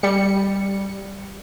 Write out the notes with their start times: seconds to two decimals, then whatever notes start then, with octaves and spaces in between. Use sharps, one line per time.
0.03 G3 C#7